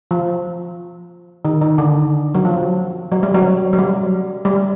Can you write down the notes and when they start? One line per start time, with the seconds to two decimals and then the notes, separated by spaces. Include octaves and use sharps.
0.11 F3
1.45 D#3
1.62 D#3
1.78 D3
2.35 F#3
2.45 F3
3.12 F#3
3.23 G3
3.35 F#3
3.73 F#3
3.78 G3
4.45 G3